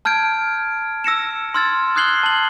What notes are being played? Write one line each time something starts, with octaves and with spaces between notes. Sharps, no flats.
A5 F6 G6 G#6 D7
E6 A#6 C#7 E7
C6 E6 F6 G#6 A6
D#6 F#6 G#6 C7 F#7 G7
A5 F#7